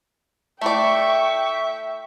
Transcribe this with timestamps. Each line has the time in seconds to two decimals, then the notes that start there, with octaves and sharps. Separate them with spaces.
0.62 A3 E4 D5 E5 G5 C#6